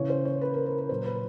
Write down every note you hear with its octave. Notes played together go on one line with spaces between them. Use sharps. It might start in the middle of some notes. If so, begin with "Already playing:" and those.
Already playing: C#3 E3 C#5
C5
C#5
B4
A#4
B4
B4
A#2 F#3 C5
B4